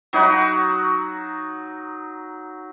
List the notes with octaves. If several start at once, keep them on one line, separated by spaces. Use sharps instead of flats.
F#3 D#4 F#4 B5